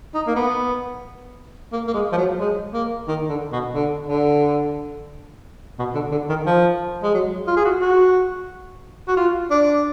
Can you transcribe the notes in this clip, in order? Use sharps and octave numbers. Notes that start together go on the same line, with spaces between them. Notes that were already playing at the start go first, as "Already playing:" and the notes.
D#4
A#3
B3
A#3
A#3
G#3
F3
F#3
G#3
A#3
D#3
D3
B2
D3
D3
B2
D3
D3
D#3
F3
G#3
F#3
F4
G#4
F#4
F#4
F#4
F4
D4